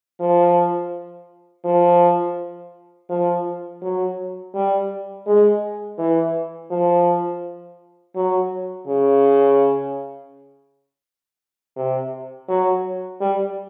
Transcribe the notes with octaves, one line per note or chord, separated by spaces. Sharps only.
F3
F3
F3
F#3
G3
G#3
E3
F3
F#3
C#3
C3
F#3
G3